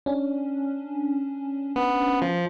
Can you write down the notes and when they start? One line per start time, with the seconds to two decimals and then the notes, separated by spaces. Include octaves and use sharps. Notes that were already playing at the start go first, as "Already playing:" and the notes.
0.06 C#4 D4
1.76 B3
2.22 F3